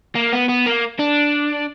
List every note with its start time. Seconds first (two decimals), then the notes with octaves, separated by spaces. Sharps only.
0.15 A#3
0.33 B3
0.49 B3
0.66 A#3
0.99 D4